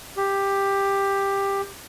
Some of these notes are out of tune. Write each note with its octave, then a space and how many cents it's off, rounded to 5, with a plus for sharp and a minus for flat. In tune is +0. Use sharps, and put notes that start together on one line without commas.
G4 +10